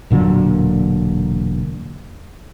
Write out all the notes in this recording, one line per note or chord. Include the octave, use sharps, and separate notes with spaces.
E1 A#2 D3 F#3